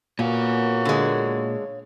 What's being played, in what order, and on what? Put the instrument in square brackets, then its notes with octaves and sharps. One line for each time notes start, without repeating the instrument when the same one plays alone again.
[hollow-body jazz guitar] A#2 [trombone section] A#3 B3 F#4 [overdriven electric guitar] C#5 F5
[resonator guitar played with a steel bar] D3 G#3